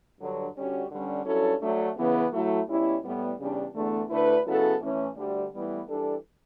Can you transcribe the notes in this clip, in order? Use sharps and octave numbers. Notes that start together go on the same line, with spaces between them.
G2 D3 F#3
D3 G3 C#4 F#4
G2 D3 G3 C#4
G2 F#3 C#4 E4 A4
F#3 A3 D4
C#3 E3 B3
F#3 A3 E4
B2 G3 C#4 E4
A2 G3 B3
E2 C#3 G3 D4
E2 D3 A3
D2 D3 A3 E4 B4
C#3 F#3 B3 E4 A4
A2 E3 A3 C#4
D2 D3 G3
A2 E3 G3 B3
E3 G3 D4 A4